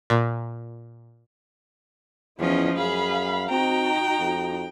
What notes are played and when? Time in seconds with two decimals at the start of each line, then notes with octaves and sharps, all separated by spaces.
0.10 A#2
2.40 E2 F3 C#4 E4 D#5
2.78 F#2 G#4 F5 B5
3.51 C4 D#4 F#4 G5 A#5
4.20 F2